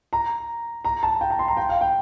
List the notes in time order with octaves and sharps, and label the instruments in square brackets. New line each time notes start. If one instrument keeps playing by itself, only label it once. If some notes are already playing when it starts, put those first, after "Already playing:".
[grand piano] A#5
A#5
A5
G5
A#5
C6
A#5
G5
F5
G5